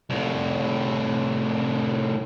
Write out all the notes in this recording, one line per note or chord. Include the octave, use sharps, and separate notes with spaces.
C2 A2